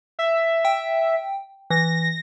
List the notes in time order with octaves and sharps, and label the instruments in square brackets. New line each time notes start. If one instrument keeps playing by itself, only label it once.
[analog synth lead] E5
[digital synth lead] G5
[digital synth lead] E3 [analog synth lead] A#6